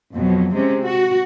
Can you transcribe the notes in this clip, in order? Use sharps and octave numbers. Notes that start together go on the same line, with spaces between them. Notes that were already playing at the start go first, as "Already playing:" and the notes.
F2 B2 F#3
C3 G#3 C#4
F#4